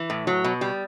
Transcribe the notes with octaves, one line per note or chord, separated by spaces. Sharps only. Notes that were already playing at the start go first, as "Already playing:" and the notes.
Already playing: E3
A2
F#3
B2
G3